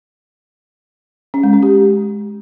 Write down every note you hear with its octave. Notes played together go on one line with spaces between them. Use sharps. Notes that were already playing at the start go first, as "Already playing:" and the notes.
C#4
G#3
C#4
G4